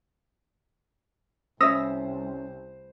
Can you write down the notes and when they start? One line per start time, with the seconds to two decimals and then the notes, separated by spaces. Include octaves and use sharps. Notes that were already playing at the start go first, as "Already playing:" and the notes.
1.61 C2 C#4 C5 E5 D#6 E6 A#6